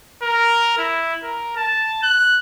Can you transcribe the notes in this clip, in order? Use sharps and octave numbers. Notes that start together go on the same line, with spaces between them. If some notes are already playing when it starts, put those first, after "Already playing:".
A#4
E4
A#4
A5
F#6